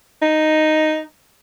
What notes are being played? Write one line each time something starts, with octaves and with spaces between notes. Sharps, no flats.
D#4